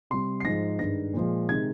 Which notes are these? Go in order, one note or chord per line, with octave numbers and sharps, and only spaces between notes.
C3 G3 C6
C7
G#2 F3 G#3 A#6
G2 D#3 G#3 A#6
A#2 F3 G#3
C3 D#3 G#3 G#6